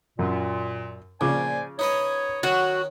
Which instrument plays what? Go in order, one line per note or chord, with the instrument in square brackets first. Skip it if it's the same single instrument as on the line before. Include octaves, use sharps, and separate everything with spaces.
[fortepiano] F#2 [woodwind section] A#2
[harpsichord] A#2 [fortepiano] C#3 F3 D6 [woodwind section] C5 D5 G#5
[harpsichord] D#4 B4 D#5 [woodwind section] C#5
[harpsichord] D#3 C#4 [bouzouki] F#4